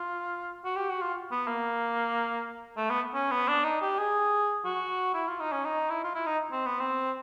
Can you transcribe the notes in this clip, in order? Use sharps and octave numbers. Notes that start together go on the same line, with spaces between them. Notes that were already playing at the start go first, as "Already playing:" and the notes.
Already playing: F4
F#4
G4
F#4
F4
B3
A#3
A3
B3
C#4
B3
D4
D#4
G4
G#4
F#4
E4
F4
D#4
C#4
D#4
E4
F4
E4
D#4
C4
B3
C4